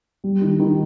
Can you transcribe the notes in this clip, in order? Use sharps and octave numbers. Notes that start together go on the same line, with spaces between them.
G3
D#3
D#3